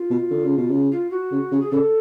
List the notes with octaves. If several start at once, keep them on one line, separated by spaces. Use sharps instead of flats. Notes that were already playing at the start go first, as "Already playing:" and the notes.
Already playing: F4
B2
D3
C#3
B2
C#3
F4
F#4
C#3
C#3
G#4
C#3 A4